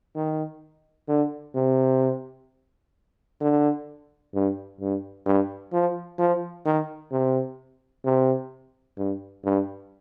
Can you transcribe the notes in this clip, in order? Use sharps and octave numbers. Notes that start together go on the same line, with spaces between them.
D#3
D3
C3
D3
G2
G2
G2
F3
F3
D#3
C3
C3
G2
G2